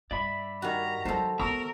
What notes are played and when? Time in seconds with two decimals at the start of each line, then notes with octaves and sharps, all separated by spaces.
0.11 G2 D5 E5 B5
0.62 D#3 G3 F#4 A#5
1.05 F#3 D#4 A4 C5
1.40 D#3 B3 A#4 A#5 C#6 E6